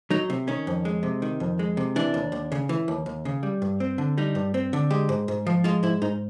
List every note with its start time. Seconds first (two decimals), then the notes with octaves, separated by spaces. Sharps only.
0.10 F#3 D#4
0.30 C3
0.48 D#3 C#4
0.67 F2
0.85 G#3
1.03 C3
1.22 D#3
1.40 F2
1.59 G#3
1.77 C3
1.96 E3 D4
2.14 D#2
2.32 D#2
2.52 C#3
2.69 E3
2.88 D#2
3.06 D#2
3.25 C#3
3.43 G3
3.62 G2
3.80 C4
3.98 D3
4.18 G3 D#4
4.35 G2
4.54 C4
4.73 D3
4.90 G#3 G4
5.09 G#2
5.28 G#2
5.46 F3
5.64 G#3 F4
5.83 G#2 E4
6.02 G#2 D#4